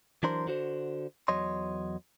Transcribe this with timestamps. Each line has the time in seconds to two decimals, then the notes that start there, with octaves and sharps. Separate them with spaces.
0.23 E3 F#3 D4 A#4 C5 C6
0.47 D3 F#4 C5
1.28 E2 F#3 C#5 D#5 C6